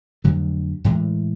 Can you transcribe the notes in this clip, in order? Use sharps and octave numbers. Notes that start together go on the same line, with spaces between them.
F2 D3 F#3 A3
A2 E3 G#3